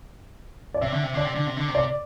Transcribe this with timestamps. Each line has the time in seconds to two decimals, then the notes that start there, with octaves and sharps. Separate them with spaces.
0.74 D5
0.81 C3 E5
0.92 D3
1.03 C3
1.14 D3 D5
1.25 C3
1.35 D3
1.47 C3
1.57 D3
1.68 C3
1.75 D5